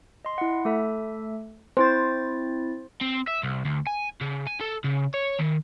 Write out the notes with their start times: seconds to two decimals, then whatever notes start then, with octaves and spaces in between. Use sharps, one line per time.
0.25 D#5 C6
0.38 E4 F#5
0.65 A3 A4 E5
1.77 C4 E4 C5 A6
3.01 C4
3.27 E5
3.43 C2
3.65 D2
3.87 G#5
4.21 C#3
4.47 G#5
4.61 A4
4.84 C#3
5.14 C#5
5.39 D#3